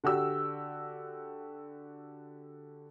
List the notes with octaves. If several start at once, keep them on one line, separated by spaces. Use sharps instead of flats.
D3 F#4 G4 E6